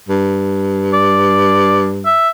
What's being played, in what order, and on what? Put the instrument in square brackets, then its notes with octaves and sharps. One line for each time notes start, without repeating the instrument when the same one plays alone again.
[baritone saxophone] G2
[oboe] D5
E5